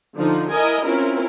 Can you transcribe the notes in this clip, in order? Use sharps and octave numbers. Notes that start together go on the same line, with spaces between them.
D3 F3 D#4
E4 A#4 D#5 G#5
C4 C#4 E4 F4 A#4